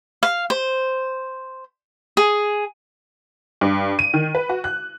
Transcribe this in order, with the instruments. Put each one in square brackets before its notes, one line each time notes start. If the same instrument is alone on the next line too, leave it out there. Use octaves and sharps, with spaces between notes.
[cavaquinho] F5
C5
G#4
[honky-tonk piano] G2
D#7
D#3
B4
F#4
F#6